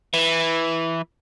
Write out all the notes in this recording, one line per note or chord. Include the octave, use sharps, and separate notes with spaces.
E3